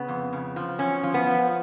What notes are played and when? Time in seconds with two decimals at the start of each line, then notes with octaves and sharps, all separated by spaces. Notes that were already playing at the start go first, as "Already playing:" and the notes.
Already playing: C#3 B3
0.08 F2
0.33 C#3
0.56 F3
0.79 F#2 C#4
1.03 F3
1.14 B3
1.26 F3